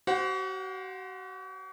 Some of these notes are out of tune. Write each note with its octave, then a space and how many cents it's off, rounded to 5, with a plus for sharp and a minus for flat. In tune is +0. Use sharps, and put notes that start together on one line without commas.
F#4 +40 C5 +0 F#5 -30